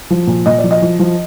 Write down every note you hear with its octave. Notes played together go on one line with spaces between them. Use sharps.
F3
A#2
A#2 D#5
D5
F3
D#5
F3
F3